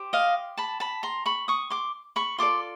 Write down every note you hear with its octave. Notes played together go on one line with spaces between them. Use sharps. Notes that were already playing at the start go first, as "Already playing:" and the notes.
Already playing: G4 C5
D#5 F5
A5 B5
A5 B5
A#5 C6
B5 C#6
C#6 D#6
C6 D6
B5 C#6
F4 A4 D5 C6 D6